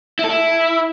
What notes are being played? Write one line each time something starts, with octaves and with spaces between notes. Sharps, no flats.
E4
A4
E4